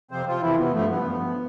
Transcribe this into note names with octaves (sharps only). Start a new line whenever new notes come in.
F2 C3 F3 C4 C5
F3 F4
F2 C3 E3 F3 E4
B3
G2 F3 A3
B3
G2 F3